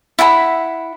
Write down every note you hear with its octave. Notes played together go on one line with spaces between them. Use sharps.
E4 F#5 G#5 B5